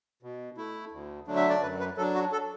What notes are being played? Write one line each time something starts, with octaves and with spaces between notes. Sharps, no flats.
B2
A3 E4
D2
D3 F#3 A3 D4
E5
D5
F#2 B4
B4
F#3 D4 A4
F#4
A4